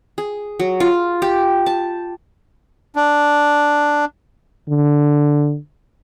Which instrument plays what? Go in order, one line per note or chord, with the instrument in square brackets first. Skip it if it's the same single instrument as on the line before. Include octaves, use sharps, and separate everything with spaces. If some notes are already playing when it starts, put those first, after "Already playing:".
[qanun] G#4
F#3
F4
G4
A5
[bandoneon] D4
[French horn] D3